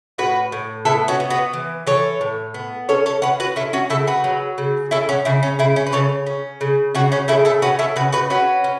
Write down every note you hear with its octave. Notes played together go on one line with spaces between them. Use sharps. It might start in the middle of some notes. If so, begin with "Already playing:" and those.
A2 F#4 B4
A2
B3 E4 A4
C#4 F#4
B3
F#4 B4
E3
E3 A4 C#5
A2
B3
C#4 A4 C#5
A4 C#5
C#4 F#4 B4
F#4 B4
C#4 E4 A4
C#4 F#4
C#3 E4 A4
F#4 B4
F#3
C#3
C#4 E4 A4
C#4 F#4
C#3 E4
C#4
C#3 E4
C#4
B4
C#3 A4 C#5
C#4
C#3
C#3 C#4 F#4
C#4 F#4
C#3 E4 A4
E4 A4
C#4 F#4 B4
E4 A4
C#3 F#4 B4
F#4 B4
C#4 F#4 B4
C#4